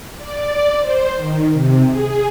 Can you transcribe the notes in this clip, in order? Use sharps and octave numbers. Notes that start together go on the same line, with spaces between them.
D5
C5
D#3
C3
G#4